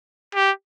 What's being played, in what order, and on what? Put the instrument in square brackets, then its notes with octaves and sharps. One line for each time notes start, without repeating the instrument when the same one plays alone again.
[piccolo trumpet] G4